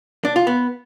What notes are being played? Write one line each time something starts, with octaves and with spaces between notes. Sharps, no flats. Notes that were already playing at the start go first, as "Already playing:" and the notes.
D4
F4
B3